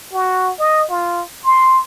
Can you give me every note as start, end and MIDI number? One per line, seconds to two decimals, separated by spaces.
0.13 0.52 66
0.59 0.84 75
0.89 1.22 65
1.44 1.80 84